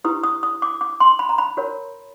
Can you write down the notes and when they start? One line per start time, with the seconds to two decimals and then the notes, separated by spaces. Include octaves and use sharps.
0.04 E4 G4 B4 D#6
0.24 D#6
0.43 D#6
0.62 D6
0.81 D6
1.00 C6
1.19 B5
1.29 A#5
1.38 B5
1.57 F#4 A#4 C#5